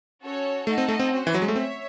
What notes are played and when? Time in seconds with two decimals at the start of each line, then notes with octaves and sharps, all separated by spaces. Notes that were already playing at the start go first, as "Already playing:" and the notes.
0.23 C#4 F#4 A4 C#5
0.67 A3 D#4 A4 D#5 F#5
0.78 C4
0.88 A3
1.00 C4
1.12 C#4 F#4 C5
1.27 E3
1.34 F#3
1.42 G#3
1.48 A3
1.56 C4 C#5 E5